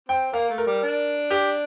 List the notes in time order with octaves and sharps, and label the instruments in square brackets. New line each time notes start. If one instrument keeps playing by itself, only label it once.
[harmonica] C4 [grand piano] G5
[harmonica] A#3 [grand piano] F5
[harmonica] A3
[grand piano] A#4
[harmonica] G3
D4
[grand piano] G4